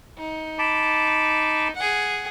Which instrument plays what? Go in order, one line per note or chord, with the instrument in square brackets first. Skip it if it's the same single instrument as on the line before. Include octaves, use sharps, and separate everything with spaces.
[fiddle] D#4
[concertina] A5 B5 D6
[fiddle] G#4 F#5